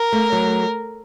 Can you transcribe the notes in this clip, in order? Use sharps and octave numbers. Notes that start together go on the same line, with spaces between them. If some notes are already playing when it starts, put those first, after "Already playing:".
Already playing: A#4
A3
F#3